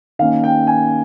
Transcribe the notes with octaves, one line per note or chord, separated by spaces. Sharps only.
D#3 A#3 C#4 F5
G5
G#5